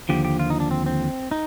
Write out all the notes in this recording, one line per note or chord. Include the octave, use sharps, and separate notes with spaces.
D#2 D3 F3 G4
G4
F4
D#4
D4
C4
C4
D#4